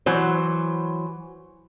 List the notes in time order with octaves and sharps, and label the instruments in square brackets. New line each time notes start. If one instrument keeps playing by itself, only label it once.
[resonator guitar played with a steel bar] E3 F#3 C5